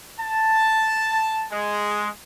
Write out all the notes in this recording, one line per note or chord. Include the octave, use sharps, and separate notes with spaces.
A5
G#3